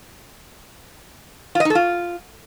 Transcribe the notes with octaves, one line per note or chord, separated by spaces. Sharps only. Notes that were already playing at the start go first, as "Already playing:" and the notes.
F4
D#5
D#4
A4
F4